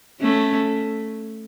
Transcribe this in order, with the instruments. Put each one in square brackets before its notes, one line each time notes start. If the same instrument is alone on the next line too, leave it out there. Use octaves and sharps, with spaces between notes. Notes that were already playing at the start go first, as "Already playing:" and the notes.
[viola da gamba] A3 C#4